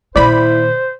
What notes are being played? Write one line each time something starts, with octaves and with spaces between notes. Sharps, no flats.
A#2 D#3 E4 C5 D5 B5